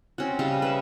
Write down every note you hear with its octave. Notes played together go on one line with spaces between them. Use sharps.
C4 C#4 F#4
C#3 G3 D#5
B4 E5